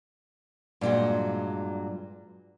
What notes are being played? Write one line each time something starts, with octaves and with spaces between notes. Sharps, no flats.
G2 A#2 E3 F#3 G#3